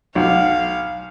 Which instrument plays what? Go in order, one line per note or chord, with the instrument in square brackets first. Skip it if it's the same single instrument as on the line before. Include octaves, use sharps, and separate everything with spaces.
[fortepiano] B1 [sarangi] F5